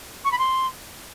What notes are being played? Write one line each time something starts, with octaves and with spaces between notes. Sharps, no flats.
C#6
B5
C6